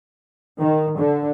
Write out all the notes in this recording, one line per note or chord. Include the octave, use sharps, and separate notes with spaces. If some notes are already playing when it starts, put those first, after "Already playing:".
D#3
D3